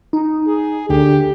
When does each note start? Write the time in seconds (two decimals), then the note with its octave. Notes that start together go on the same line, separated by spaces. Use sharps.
0.13 D#4
0.47 G#4
0.90 D2 D3 G4